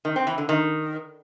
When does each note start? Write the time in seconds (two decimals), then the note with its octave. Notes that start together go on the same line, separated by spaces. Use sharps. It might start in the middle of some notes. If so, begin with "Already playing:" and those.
0.05 D#3
0.16 C4
0.27 E3
0.38 D3
0.49 D#3